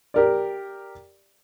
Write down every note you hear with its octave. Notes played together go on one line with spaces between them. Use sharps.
G4 A#4 D5